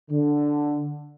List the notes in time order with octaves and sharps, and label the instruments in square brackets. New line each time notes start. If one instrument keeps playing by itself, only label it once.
[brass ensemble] D3